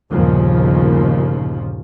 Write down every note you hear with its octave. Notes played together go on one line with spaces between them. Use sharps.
G1 D#2 A#2 C#3 F3